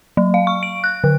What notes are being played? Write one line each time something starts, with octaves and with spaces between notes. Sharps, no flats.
F#3
F5
C#6
D7
F#6
D3